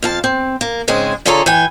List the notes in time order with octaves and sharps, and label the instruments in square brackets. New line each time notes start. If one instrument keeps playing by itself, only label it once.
[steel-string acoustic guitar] F2 F5 A5
C4
A#3
G#2 C#3 G#3 C4 G#4
D3 F4 G#4 A4 C#5 A#5
E3 G5 G#5